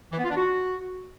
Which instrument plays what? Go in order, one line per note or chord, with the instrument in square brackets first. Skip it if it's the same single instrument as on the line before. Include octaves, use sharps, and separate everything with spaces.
[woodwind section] E3
B3
F4
D4
F#4